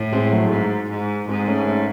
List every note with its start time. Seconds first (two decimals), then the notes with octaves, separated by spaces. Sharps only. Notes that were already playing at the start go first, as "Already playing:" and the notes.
Already playing: A2
0.13 G#3 C4
0.32 F#3 A3
0.50 G#2 G#3
0.89 G#2
1.28 G#2 G#3 C4
1.47 A3 C#4
1.66 A3 C#4